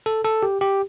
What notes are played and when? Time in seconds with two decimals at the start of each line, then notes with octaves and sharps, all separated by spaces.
0.06 A4
0.24 A4
0.43 G4
0.61 G4